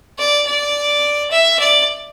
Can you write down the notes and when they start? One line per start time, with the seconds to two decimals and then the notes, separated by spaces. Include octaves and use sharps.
0.18 D5
0.47 D5
1.31 E5
1.59 D5